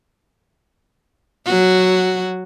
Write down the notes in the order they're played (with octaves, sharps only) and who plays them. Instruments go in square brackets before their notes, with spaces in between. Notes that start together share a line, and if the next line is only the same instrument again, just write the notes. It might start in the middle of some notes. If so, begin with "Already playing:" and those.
[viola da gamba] F#3 F#4